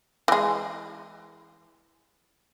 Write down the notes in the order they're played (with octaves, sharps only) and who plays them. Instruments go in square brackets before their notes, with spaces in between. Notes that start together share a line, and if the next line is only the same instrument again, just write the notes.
[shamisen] E3 G#3